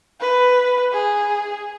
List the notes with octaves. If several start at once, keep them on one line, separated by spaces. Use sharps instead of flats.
B4
G#4